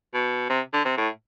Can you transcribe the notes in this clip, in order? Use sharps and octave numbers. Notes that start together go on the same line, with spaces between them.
B2
C3
D3
C3
A2